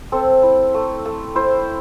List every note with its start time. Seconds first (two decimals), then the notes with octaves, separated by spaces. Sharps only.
0.12 C4 A4
0.43 E4
0.74 A3
1.05 A3
1.35 E4 C5